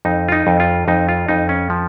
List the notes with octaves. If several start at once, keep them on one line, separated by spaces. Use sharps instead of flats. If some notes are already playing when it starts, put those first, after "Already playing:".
F2 D#4
F4
D#4
F2
F4
F2 D#4
F4
F2 D#4
C#4
F3